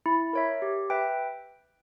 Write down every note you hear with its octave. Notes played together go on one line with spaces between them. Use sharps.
E4
A#4 C#5 E5
G4
B4 E5 G5